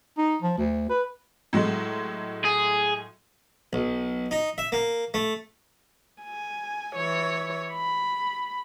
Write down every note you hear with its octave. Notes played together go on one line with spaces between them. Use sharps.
D#4
F3
D2
B4
A2 F#3 G#3
G#4
B1
D#4
E5
A#3
A3
G#5
E3 C#5
B5